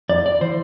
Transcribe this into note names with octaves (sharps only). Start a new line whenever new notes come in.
F2 D5
D5
E3 C5